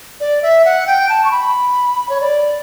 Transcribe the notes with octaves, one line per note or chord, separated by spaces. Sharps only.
D5
E5
F#5
G5
A5
C#6
B5
C#5
D5